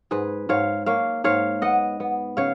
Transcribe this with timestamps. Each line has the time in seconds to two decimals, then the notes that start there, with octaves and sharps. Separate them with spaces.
0.11 G#2 G#4 B4
0.49 G#2 C#5 F5
0.86 A#3 C#5 F5
1.24 G#2 C#5 F5
1.61 B3 D#5 F#5
2.00 B3
2.37 C#3 C#5 F5